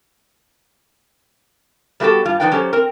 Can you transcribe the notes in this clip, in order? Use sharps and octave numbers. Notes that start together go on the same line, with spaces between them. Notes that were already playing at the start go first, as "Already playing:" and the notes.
G3 A3 B3 F#4 G4 A4
G2 G3 F4
F3 G3 D#4 B4 D5 G5
F#3 C#4 G4 A4 C5
C4 A#4